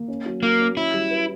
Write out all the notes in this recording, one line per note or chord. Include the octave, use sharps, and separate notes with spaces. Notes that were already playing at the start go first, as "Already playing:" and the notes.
Already playing: A#3
C#4
F#3
F#3 A#3
C#4
C#4 E4
G3
B4